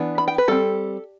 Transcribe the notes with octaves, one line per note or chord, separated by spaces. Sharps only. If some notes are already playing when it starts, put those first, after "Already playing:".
Already playing: E3 B3 D4
B5
G5
B4
G3 C4 A4